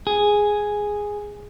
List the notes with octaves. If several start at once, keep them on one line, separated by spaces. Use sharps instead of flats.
G#4